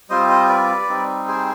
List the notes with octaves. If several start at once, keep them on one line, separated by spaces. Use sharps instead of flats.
G3 C4 F4 C5 D#5
C5 D#5
B4 D5
G3 C4 D#4
G#4 C5